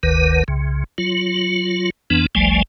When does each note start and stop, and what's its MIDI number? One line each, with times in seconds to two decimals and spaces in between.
0.03 0.44 30
0.03 0.44 38
0.03 0.44 51
0.03 0.44 71
0.48 0.84 36
0.48 0.84 49
0.98 1.90 54
0.98 1.90 65
2.10 2.26 41
2.10 2.26 52
2.10 2.26 59
2.10 2.26 62
2.35 2.62 31
2.35 2.62 37
2.35 2.62 53
2.35 2.62 55
2.35 2.62 57
2.35 2.62 80